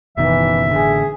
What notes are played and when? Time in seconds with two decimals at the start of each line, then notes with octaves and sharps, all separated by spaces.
0.17 F#1 B2 D#3 E3 E5
0.71 A1 D3 G#4